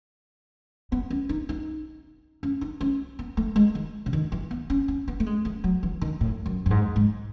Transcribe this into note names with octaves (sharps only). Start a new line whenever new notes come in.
B3
C#4
D#4
D#4
C#4
D#4
C#4
B3
A3
G#3
D#3
C#3
D#3
E3
B3
C#4
C#4
B3
A3
G#3
A3
F#3
E3
D#3
A2
F#2
F#2
G#2
G#2